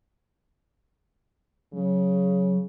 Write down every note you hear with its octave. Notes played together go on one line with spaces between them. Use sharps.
C#3 F#3